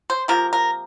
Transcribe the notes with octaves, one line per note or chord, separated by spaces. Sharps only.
C5
C3 F3 A#3 A#4
A#4